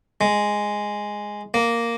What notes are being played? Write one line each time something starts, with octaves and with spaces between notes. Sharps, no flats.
G#3
A#3